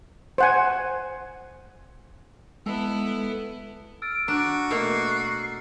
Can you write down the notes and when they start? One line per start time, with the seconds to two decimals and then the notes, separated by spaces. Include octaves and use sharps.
0.38 C5 F#5 G#5
2.66 G#3 B3 E4 A4
4.02 E6 F6 A6 D7
4.28 D4 F#4 A#5
4.70 B2 A3 A#3 C7